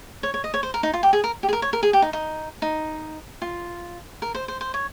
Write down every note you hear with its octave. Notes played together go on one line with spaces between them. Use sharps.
C#5
C#5
D#5
C#5
C5
A#4
D#4
F4
G4
G#4
A#4
G4
G#4
A#4
C#5
A#4
G#4
G4
D#4
D#4
D#4
F4
A#4
C5
C5
C5
C#5